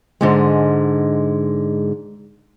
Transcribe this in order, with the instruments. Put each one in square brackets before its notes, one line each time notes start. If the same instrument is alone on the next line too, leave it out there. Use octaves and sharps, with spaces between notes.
[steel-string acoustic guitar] G#2 D3 G#3